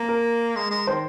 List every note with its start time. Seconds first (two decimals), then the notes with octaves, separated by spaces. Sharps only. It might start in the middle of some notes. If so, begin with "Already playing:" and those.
Already playing: A#3
0.09 A#4
0.56 G#3
0.71 G#3
0.87 D#3 C5